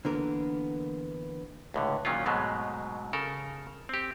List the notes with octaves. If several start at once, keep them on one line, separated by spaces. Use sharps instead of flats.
D3 E3 A#3 B3 A#4
C#2 A2 D3
A#2 D#3 F#3 C#4 F4
G#2 B2 F#3 G#3 A3
C#3 A4 A#4
C4 G4